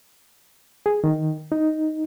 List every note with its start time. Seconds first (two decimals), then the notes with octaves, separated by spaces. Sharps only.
0.86 G#4
1.04 D#3
1.52 D#4